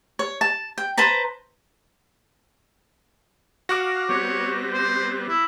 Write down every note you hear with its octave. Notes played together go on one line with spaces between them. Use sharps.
C#5
A5
G5
B4 C5 A5 A#5
F#4 F5 C#6 D6 F#6 A#6
G3 B3 C4 C#5
C5
E4